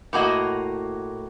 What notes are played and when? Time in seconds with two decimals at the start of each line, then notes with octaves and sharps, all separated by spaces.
0.13 A2 A#3 F#4 D#5